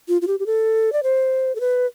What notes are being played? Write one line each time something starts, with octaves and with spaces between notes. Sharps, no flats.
F4
F4
G4
G4
A4
D5
C5
A4
B4